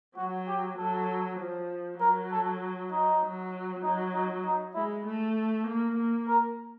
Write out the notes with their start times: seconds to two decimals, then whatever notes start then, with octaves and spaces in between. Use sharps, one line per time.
0.16 F#3 F#4
0.47 G4
0.77 F#3 A4
1.39 F3
1.99 F#3 A#4
2.31 A4
2.92 D#4
3.22 F#3
3.83 F#3 D#4
4.14 D#4
4.45 D#4
4.75 G#3 E4
5.06 A3
5.67 A#3
5.97 A#3
6.28 A#4